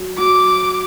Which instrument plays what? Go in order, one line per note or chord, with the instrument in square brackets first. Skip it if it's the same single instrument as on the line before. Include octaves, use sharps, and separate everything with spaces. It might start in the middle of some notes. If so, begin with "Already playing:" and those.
Already playing: [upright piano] F#3
[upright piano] F#3 [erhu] D6